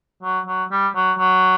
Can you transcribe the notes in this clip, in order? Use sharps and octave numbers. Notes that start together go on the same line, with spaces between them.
F#3
F#3
G3
F#3
F#3